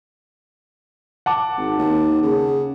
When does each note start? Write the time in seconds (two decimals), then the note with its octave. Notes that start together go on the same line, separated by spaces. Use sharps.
1.26 F#5 A5 D6
1.57 G#1
1.78 D#2
2.23 C#3